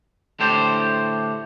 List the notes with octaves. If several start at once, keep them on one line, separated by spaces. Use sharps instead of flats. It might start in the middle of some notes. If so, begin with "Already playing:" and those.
A2 D3 G4 C5